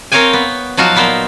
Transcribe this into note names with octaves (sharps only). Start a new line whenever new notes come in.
C4 A#4 C#5 F5 G5 G#5
B3
F3 F#3 D#4 F4 F#4 F5
A#2 B3 A#4 C5